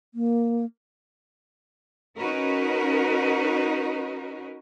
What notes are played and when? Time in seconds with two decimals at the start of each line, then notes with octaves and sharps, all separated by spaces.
0.14 A#3
2.17 C#4 D#4 F#4 A#4 B4